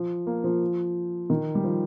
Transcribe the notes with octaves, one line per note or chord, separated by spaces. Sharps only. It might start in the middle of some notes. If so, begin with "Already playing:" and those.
Already playing: F3
A#3
F3
D#3
G3
F3